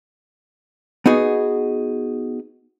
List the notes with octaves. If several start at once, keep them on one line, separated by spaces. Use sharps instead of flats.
B3 D#4 F#4 G#4